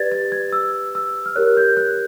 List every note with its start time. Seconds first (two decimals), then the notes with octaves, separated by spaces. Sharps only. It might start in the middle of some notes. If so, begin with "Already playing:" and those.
Already playing: G4 B4 D5 G#6 A6
0.12 A6
0.32 G#6
0.52 E6
0.95 E6
1.26 F6
1.36 G4 A#4 C#5 F#6
1.57 G6
1.77 F#6